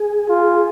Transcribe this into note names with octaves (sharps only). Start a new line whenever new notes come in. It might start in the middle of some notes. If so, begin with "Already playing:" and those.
Already playing: G#4
F4